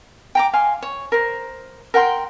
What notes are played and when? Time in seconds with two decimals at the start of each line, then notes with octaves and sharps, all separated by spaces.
0.35 G5 A#5 D6
0.53 F5 G#5 C6
0.82 C#5
1.12 A#4 C5
1.94 A#4 F#5 G5 C6